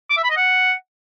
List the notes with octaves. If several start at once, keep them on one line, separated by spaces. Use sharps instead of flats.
D6
E5
B5
D#5
F#5